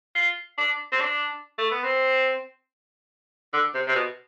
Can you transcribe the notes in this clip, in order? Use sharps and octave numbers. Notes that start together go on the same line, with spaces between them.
F4
D4
C4
D4
A3
B3
C4
D3
C3
C3
B2